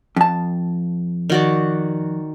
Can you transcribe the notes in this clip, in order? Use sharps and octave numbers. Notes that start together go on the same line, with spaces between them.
F2 A5
D#3 F#4 D5